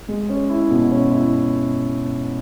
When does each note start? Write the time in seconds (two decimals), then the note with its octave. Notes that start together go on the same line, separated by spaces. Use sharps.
0.08 G#3
0.29 C#4
0.49 E4
0.71 B2
0.91 C#4
1.11 E4